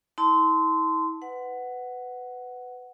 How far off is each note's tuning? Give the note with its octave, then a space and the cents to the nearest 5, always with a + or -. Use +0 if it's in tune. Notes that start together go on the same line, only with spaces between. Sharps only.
E4 -40 A5 +0 C6 -20
B4 +20 F#5 +5